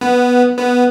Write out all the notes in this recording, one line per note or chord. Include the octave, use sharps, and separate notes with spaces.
B3
B3